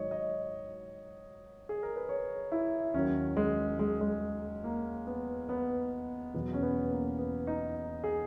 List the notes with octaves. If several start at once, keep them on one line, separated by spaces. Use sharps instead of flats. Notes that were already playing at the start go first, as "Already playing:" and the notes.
Already playing: G#2 D#3 F#3 C#5 D#5
D#5
G#4
A#4
B4
C#5
E4
D#2 D#3 F#3 C#4
G#3
G#3
G#3
A#3
B3
B3
E2 B2 F#3 B3
C#4
B3
A#3
B3
D#4
G#4